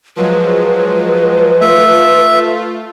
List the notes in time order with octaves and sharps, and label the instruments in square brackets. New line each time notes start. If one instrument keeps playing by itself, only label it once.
[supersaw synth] F3 F#3 G#3 [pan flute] B4
[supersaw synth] A3 F4 [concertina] E5